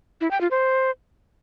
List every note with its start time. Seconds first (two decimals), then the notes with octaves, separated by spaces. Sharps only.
0.21 E4
0.31 G5
0.41 F4
0.51 C5